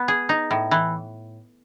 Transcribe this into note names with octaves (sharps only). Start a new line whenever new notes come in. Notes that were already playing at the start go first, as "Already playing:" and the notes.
Already playing: B3
G#4
D#4
A2
E3